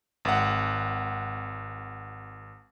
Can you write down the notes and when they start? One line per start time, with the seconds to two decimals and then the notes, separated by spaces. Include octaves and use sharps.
0.25 G#1 F#5